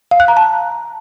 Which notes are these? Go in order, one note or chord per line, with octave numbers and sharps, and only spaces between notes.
F5
F#6
A#5
A5